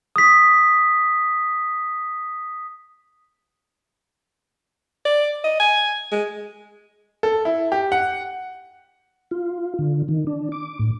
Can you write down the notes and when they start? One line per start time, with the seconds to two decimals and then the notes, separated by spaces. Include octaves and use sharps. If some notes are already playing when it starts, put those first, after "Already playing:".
0.16 D#6 B6
5.05 D5
5.44 D#5
5.60 G#5
6.11 G#3
7.23 A4
7.45 E4
7.72 G4
7.92 F#5
9.31 F4
9.79 D3
10.08 D#3
10.27 D4
10.52 D6
10.79 A2